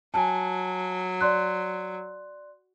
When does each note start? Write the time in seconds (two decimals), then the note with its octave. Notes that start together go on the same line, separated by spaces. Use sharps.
0.14 F#3 G#5 A5
1.21 D5 C6 F#6